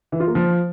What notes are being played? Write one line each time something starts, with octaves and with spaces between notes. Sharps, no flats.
E3
F4
A#3
F3